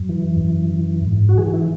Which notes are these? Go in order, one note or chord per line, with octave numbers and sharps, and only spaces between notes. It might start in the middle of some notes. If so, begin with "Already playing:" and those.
Already playing: F#2
E3
F#2
E3
G#2
F#4
E3 G#4
E4